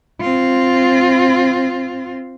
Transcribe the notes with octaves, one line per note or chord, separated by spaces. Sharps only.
C4 F4